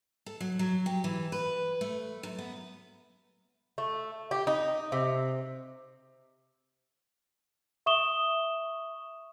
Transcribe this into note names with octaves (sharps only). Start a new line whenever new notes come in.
A4
F#3
F#3
G4
E3
B4
A3
F#2
B3
A3
G4
D#4
C3
E5 C#6 D#6 E7 G7